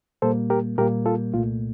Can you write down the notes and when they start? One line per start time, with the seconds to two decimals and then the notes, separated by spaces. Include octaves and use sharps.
0.22 A#2 G3 A#3 A4 C5
0.50 G4 A#4
0.78 A#2 G3 A#3 G4 A#4
1.06 F4 A4
1.33 C2 A#2 A3 F4